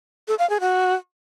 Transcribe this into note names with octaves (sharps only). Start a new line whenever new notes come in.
A4
F5
G#4
F#4